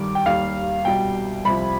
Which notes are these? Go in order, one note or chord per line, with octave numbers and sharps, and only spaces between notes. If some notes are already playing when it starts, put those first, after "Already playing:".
Already playing: G2 D#3 G3 D6
G5
D#2 D#3 G3 F5
C2 B2 G3 G5
C2 C3 F3 B5